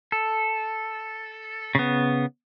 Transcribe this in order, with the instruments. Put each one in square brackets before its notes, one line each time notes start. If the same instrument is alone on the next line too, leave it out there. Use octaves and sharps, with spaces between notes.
[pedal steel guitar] A4
C#3 B3